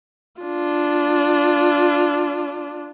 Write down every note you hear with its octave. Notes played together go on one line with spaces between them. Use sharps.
D4 F4